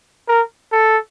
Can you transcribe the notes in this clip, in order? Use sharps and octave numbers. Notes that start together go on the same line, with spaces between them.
A#4
A4